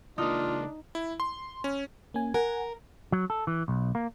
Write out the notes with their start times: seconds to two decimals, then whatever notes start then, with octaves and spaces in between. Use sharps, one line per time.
0.18 C#2 A#3 D4 D#4 F4
0.95 E4
1.20 C6
1.64 C#4
2.14 A#3 C#4 G#5
2.34 A#4 F#5 G#5
3.12 F#3
3.30 A4
3.47 E3
3.68 B1
3.95 A#3